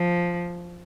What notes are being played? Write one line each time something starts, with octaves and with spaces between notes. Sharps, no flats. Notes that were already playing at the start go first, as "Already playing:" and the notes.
Already playing: F3